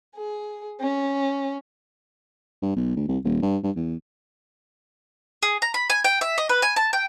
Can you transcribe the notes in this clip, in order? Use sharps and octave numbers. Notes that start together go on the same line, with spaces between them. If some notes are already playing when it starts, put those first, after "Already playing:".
G#4
C#4
G2
B1
D2
C2
D#1
G2
G2
E2
G#4
A#5
B5
G#5
G5
E5
D#5
B4
G#5
A5
G5